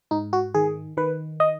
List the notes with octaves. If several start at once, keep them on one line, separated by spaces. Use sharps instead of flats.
G#2 D#4
F#4
D#3 G#4
D#3 B4
D#5